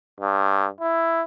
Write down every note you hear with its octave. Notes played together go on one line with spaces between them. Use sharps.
G2
E4